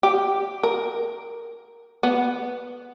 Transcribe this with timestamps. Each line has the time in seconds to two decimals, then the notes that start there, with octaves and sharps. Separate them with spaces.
0.03 G4
0.63 A#4
2.03 B3